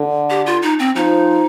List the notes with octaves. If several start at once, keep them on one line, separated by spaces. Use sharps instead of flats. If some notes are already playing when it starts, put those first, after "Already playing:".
Already playing: D3
G4
F4
D#4
C4
F3 D#4